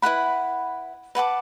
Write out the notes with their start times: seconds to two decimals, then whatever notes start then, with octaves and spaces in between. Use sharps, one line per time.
0.02 E4 B4 F#5 B5
1.15 B4 F#5 A5 D6